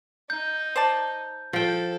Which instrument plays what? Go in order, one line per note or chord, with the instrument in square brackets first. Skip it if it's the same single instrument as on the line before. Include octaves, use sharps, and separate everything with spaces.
[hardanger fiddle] D#4 [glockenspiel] G6
[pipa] C5 D5 A5
[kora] F3 G5 [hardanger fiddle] A4